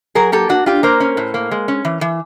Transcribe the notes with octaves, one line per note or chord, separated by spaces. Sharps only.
F#3 G#4 A#4
A#3 G4 A4
D4 F#4
D4 F4 G4
A#3 A#4 C5
C#4
A2
A#3
G#3
C#4
E3
E3